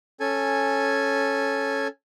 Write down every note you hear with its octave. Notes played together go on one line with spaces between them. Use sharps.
C#4 A4 G#5